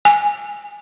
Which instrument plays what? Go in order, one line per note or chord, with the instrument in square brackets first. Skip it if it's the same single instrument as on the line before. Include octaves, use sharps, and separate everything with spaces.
[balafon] G#5